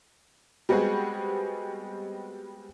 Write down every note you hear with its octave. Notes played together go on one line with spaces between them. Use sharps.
G3 G#3 B3 C4 F#4 G#4